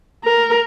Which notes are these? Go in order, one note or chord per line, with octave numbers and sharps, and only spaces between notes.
A#4